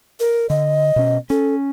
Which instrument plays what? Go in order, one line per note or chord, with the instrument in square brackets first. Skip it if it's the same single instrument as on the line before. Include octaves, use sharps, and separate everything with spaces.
[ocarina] A#4
[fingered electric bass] D3 [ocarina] D#5
[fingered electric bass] B2 C#4
[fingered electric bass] C#4 [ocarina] A4